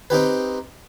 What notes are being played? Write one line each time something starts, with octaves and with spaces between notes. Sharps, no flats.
C4 D#4 G4 B4